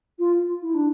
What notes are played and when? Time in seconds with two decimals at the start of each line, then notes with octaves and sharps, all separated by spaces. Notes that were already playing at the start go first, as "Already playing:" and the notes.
0.19 F4
0.62 E4
0.74 D4